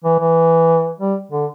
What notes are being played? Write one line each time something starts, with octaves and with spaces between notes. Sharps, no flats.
E3
E3
G3
D3